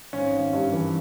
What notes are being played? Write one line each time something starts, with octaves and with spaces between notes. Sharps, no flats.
G#1 C#4
G#1
G2
E3